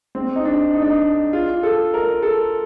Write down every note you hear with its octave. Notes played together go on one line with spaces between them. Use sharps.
C4
D#4
D4
D#4
D4
D#4
F4
A4
A#4
A4